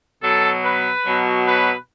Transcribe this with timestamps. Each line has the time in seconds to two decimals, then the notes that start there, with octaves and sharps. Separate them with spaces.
0.23 B2 F#3 A4
0.64 B4
1.06 B2 F#3
1.47 B4